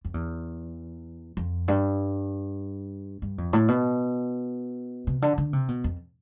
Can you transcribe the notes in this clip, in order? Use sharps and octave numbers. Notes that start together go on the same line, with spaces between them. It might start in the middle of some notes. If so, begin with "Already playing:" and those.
F2
E2
F2
G2
G2
F2
A2
B2
C3
D3
D3
C3
B2
F2